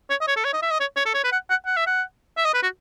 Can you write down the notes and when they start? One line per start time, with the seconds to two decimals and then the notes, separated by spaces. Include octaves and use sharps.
0.10 C#5
0.21 D#5
0.27 C#5
0.36 A4
0.44 C#5
0.53 D#5
0.62 E5
0.71 D#5
0.80 C#5
0.96 C#5
1.06 A4
1.14 C#5
1.24 B4
1.32 F#5
1.50 F#5
1.66 F#5
1.77 E5
1.87 F#5
2.37 E5
2.45 D#5
2.54 B4
2.63 F#4